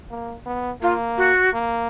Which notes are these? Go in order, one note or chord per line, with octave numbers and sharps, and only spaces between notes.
A#3
B3
A#3 F4
F#4
A#3